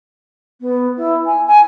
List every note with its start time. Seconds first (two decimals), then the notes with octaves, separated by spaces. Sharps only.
0.61 B3
0.97 E4
1.26 G#5
1.47 G#5